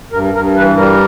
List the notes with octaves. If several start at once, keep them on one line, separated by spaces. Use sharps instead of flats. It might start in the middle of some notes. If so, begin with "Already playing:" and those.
G2 A#4
G2 A#4
E3 B4
G3 A#4